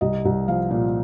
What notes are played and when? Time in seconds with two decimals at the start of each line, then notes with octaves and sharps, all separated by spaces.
0.01 C2 D#5
0.25 C2
0.48 F3 F5
0.71 A#2